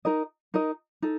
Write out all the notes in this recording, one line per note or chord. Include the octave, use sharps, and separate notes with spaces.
D#4 A#4 D#5
D#4 A#4 D#5
D#4 A4